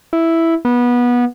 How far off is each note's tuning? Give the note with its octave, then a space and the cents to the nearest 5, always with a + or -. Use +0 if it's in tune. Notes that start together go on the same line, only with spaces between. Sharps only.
E4 +0
B3 -20